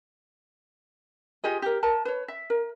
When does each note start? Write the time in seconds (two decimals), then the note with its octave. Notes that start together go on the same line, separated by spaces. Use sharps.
1.44 F4 G4 G#4 D#5
1.62 G4 A#4
1.83 A#4 A5
2.05 B4 C#5
2.28 E5
2.50 A#4